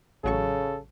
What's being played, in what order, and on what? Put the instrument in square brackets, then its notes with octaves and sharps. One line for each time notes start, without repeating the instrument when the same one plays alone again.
[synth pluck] A1 F#3 C#6 [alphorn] C#3 [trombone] A4